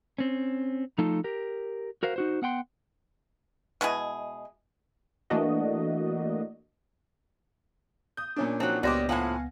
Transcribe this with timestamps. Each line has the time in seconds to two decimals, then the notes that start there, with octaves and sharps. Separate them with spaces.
0.18 C4 C#4
0.98 F3 A3 D#4 F4 A4 A5
1.24 G4 A#4
2.03 F#4 A#4 C5 F5
2.16 D#4 F#4 C5
2.42 B3 F#5 G5 C6
3.81 B2 G#3 E4 G#4
5.30 E3 A3 A#3 D4 F#4 D#5
8.17 D#6 G6
8.36 A#2 C#4 D4
8.60 F3 F#3 C4 D#4
8.83 C#2 G3 B3 F#4 G4 C5 D#5 A#6
9.09 A2 F3 F5 F#5 G#5